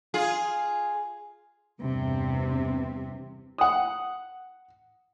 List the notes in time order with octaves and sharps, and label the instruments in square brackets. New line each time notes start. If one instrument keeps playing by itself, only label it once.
[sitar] F4 G#4
[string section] E2 G2 C3
[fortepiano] F#5 D#6